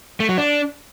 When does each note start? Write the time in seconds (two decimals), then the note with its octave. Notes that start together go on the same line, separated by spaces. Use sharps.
0.20 A3
0.29 F#3
0.38 D4